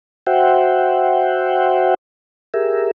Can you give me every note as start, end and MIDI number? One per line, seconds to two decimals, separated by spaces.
0.27 1.94 66
0.27 1.94 72
0.27 1.94 76
0.27 1.94 78
0.27 1.94 79
2.54 2.91 67
2.54 2.91 68
2.54 2.91 70
2.54 2.91 76